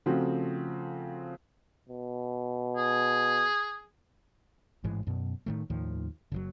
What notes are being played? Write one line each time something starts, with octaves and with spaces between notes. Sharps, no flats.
C#3 F3 A3 C4 F#4 A4
B2
G#4
A1 G#2 E3 G#3
F#2 B2
A2 D#3 A3
D#2 A2 D#3 F3
F#1 C#3 F#3